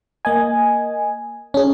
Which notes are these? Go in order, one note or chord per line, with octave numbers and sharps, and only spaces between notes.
A#3 D#5 G#5
C#4 G#4